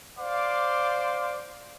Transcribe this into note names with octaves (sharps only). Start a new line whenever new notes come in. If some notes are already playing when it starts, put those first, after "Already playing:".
C5 D5 F5 C6 D6